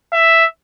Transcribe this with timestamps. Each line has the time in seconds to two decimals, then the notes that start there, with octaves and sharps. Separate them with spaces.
0.13 E5